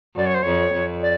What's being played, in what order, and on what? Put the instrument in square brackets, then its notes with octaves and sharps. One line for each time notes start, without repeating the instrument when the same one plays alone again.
[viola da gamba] F#2 [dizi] D5
[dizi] C#5
C5
[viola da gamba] F2 [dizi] C#5
[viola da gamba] F2
[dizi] D5